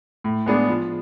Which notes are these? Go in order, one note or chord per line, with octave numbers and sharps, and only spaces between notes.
A2
G#3 B3 D4 G#4
F3